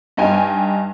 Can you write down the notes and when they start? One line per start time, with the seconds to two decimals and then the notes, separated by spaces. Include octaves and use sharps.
0.17 G2 D#4 G5 G#5